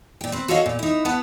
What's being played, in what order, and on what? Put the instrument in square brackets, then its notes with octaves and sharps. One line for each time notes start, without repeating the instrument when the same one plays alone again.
[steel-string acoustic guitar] A#2 G5
C4 B4
F#4 A4 B4 C#5 D#5 F5
A#2
D#4 E4
B3 B4 F#5 A5